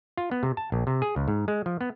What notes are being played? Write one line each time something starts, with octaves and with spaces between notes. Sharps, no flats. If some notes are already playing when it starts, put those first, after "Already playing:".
F4
B3
C3
A5
A#1
C3
G#4
C#2
G#2
G#3
F3
B3